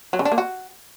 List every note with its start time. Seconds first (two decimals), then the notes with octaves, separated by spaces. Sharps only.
0.13 F#3
0.19 C#3
0.25 D4
0.32 A#3
0.38 F#4